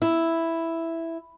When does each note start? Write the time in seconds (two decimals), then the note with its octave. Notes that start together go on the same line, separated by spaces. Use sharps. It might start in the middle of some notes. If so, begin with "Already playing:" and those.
0.02 E4